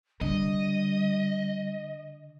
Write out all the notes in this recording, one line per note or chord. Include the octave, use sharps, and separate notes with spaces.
D3 G3 D#5